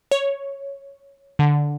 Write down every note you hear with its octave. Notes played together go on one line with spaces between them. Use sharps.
C#5
D3